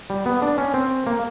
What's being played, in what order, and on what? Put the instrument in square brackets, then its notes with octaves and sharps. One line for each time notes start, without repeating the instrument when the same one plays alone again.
[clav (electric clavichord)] G3
B3
D4
C#4
C4
A#3